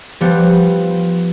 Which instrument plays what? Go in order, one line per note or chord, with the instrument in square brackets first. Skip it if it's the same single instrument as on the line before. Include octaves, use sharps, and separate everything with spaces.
[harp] F3 G3 B3